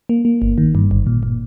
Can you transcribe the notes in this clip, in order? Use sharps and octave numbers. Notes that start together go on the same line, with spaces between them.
A#3
A#3
G1
D#3
G2
G1
A#2
A#2